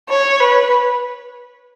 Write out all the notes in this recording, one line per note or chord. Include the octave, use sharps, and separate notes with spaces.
C#5
B4